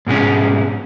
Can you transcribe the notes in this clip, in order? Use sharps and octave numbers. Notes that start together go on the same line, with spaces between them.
G#2 B2 G#3 C#4